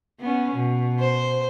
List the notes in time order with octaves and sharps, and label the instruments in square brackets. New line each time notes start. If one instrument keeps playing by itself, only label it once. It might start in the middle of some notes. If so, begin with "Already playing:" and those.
[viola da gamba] B3 C#4
B2
[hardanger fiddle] C5